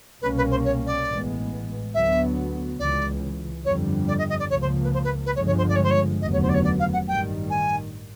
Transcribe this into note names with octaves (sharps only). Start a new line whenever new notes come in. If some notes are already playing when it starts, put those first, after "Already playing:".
C2 B2 G3 A#3 C#4 B4
B4
C5
C#5
D5
A1 A2 E3 G#3 B3
D2 D3 F#3 B3 E5
C#2 C#3 E3 D5
G1 F2 D3 G3 C#5
D5
D#5
D#5
D5
C#2 C#3 F3 A#3 C#5
C5
B4
C5
B4
B4
G1 G2 D3 F3 G#3 C#5
C#5
C5
D5
C#5
C5
C#5
F1 D#2 D3 F#3 B3 D#5
C#5
C5
D5
C#5
D5
F5
F#5
A1 G2 D#3 G3 G5
G#5